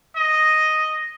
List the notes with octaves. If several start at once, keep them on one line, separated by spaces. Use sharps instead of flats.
D#5